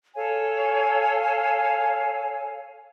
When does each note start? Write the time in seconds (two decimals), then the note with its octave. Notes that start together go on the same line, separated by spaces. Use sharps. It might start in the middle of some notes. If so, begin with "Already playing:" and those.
0.15 A4 C#5 F5 G#5